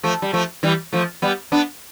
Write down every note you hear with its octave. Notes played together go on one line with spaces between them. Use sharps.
F3 A3
G3
F3 A3
E3 G3
F3 A3
G3 B3
B3 D4